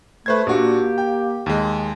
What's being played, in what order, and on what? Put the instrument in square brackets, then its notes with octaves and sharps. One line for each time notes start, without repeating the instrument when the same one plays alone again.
[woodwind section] A3 [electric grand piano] B4 C5 G#6
[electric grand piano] A#2 D4 F#4 [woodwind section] A#3 G4
[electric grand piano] G5
D#2 G#3